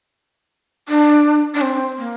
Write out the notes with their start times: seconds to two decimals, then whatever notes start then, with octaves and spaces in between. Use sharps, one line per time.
0.89 D4
1.54 D4
1.61 C4
1.98 A#3